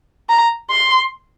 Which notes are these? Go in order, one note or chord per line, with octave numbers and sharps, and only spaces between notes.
A#5
C6